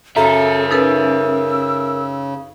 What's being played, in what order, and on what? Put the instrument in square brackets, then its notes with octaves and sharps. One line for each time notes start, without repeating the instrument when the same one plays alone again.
[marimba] F#2 [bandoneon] C#3 [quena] A4 [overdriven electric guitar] A#4 E5
[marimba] D#4 A4 B4 [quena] E6